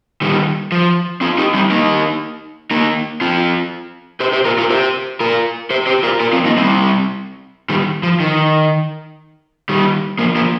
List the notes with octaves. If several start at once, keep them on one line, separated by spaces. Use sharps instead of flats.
D#3 G3
F3
C4 F4
D#4 G4
G3 C4
A#3 D#4
A#3 D#4
C4 F4
G4 C5
G4 C5
F4 A#4
F4 A#4
G4 C5
F4 A#4
G4 C5
G4 C5
F4 A#4
F4 A#4
C4 F4
A#3 D#4
G3 C4
D#3 G3
F3
D#3
D#3 G3
F3 A#3
F3 A#3